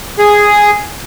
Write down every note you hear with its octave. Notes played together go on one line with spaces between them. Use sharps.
G#4